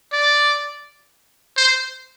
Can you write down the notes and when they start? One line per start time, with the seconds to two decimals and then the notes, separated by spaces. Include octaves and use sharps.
0.12 D5
1.57 C5